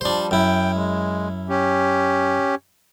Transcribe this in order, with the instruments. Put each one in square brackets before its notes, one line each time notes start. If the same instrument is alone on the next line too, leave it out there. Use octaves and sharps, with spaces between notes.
[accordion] F3 G3 [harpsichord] D4 C5
[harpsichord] F#2 E4 [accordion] G5
[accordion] G#3
C#4 G4